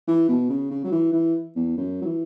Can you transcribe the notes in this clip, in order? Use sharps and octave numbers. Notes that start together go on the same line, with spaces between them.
E3
B2
C#3
C#3
F#3
E3
E3
E2
F#2
F#3
E3